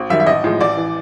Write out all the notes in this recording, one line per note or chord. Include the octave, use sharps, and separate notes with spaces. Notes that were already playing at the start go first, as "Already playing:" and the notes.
Already playing: G#1
F#2 D#3 G3 E5
E5
A1 D#5
A2 F3 G#3
A1 D5
E3